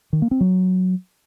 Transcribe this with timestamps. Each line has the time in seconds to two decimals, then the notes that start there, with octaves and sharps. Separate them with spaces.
0.13 D#3
0.22 A#3
0.31 C4
0.41 F#3